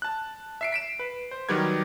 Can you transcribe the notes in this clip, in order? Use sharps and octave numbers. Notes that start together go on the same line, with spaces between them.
A5 F#6
E5 C7 D7
B6 D7 E7
B4
C5
D#3 F#3 G3 G4 B4 G#6